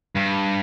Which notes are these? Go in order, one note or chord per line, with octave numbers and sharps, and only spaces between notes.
G2